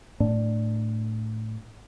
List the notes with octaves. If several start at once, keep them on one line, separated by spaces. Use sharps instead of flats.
A2 D4